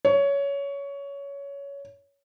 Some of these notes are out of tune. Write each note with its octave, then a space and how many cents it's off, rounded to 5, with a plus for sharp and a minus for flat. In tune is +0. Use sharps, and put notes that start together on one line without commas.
C#5 +15